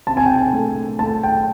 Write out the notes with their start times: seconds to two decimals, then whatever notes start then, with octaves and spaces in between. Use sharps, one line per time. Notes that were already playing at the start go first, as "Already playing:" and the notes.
0.07 C3 A5
0.17 G#5
0.26 G5
0.36 G#5
0.53 A3
0.99 A3 A5
1.23 G5